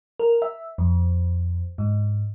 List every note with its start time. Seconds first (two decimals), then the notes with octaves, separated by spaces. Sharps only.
0.20 A#4
0.42 E5
0.78 F2
1.78 G#2